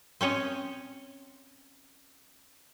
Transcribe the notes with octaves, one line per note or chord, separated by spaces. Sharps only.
C4 C#4 C#5 D#5